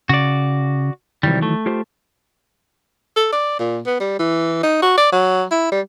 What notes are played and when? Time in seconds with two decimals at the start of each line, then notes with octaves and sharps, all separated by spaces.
0.09 C#3 F#4 D5
1.23 C2 D#3 E3 F#3 G3
1.42 A3
1.66 F4 G4 C5
3.17 A4
3.33 D5
3.59 A#2
3.86 B3
4.00 G3
4.19 E3
4.63 D#4
4.82 F#4
4.98 D5
5.12 F#3
5.51 E4
5.72 G3